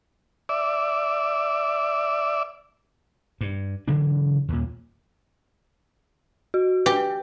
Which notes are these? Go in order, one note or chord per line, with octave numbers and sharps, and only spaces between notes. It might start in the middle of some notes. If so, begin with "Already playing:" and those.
D5 E5
G2
C#3 E3 F#3 D4
D#2 A#2
F#4
G4 B4